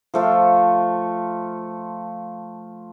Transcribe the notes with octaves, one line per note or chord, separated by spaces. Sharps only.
F3 A3 F4